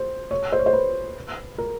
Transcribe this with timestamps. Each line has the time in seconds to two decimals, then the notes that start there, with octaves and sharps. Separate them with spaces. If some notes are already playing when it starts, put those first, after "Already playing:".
Already playing: C5
0.31 C#5
0.52 C5
0.59 C#5
0.66 C5
0.73 B4
1.58 A#4